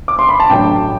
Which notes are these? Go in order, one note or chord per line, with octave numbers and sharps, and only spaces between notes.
D6
C6
B5
A5
A1 G2 F#3 A3 G5